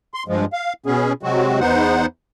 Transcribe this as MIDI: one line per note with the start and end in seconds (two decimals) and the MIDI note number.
0.14 0.23 84
0.28 0.45 43
0.28 0.45 53
0.28 0.45 56
0.53 0.73 77
0.86 1.13 47
0.86 1.13 59
0.86 1.13 61
0.86 1.13 68
1.23 1.60 48
1.23 1.60 54
1.23 1.60 56
1.23 1.60 60
1.23 1.60 66
1.60 2.06 40
1.60 2.06 59
1.60 2.06 63
1.60 2.06 72
1.60 2.06 78